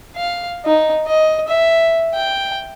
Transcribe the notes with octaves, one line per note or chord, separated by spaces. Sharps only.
F5
D#4
D#5
E5
G5